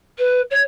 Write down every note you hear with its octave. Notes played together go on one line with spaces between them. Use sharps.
B4
C#5